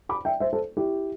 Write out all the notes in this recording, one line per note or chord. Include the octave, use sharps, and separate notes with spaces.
B5 D6
E5 G5
C5 E5
A4 C5
E4 G4